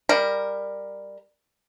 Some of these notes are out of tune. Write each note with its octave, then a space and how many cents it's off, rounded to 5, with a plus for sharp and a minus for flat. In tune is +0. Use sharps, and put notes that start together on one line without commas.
G3 +15 A#4 +0